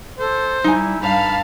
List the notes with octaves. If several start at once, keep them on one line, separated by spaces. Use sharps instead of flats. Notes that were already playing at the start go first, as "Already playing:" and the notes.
A4 C5
G3 D#4 E4 G#5
G2 F5 A5 B5